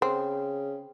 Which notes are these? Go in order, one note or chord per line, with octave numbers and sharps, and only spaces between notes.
C#3 C4